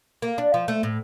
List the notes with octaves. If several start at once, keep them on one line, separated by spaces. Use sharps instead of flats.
A#3
D4
F3
A3
A2